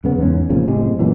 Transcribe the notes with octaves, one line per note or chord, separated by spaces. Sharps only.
F#2 C#3 B3
E2 G#2 C#4
F1 A#2 C#3 F3
F#1 A2 C3 G#3
F#2 A#2 E3 F#3